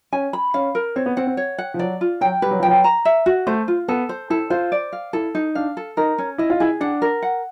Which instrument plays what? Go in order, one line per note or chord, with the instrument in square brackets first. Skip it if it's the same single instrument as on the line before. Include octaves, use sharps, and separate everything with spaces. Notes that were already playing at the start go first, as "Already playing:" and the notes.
[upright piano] C#4 [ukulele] G#5
[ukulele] B5
[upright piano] C#4 [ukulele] F5
[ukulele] A#4
[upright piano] C4 [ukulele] C#5
[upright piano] B3
[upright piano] C4 [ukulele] F#5
[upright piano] C4
[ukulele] C#5
F#5
[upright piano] F3
[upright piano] F#3 [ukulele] D5
[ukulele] F4
[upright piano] F#3 [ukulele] G5
[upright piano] G3 [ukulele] B4
[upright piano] F#3
[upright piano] F3 [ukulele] G5
[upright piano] F#3
[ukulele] A#5
E5
F#4
[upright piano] A3 [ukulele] C5
[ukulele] F4
[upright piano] B3 [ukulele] A4
[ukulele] C5
[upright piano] E4 [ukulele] A4
[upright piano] F4 [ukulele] C5
[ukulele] D5
F5
[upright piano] E4 [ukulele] A4
[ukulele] D#4
[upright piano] D4 [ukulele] F5
[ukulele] A4
[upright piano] D#4 [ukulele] A#4
[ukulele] C#4
[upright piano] E4 [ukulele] D#5
[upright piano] F4
[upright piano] E4 [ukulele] G#4
[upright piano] D4 [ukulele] F#5
[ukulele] A#4
F#5